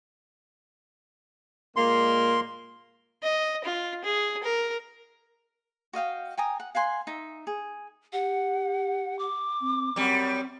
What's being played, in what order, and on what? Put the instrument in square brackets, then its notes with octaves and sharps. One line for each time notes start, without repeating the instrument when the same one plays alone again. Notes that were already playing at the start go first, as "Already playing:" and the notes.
[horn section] A#2 G#3 A#3 [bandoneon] C6
[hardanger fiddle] D#5
F4
G#4
A#4
[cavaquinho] F#4 D#5 F5 G5
G5 G#5 A#5 D#6
F#5
F5 F#5 G#5 C6
D#4 E5
G#4
[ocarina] G4 [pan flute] F#5
[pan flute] D6
[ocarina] C4
[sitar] F#2 G3 [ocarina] C4